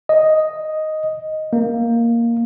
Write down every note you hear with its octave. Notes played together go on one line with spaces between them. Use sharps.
D#5
A#3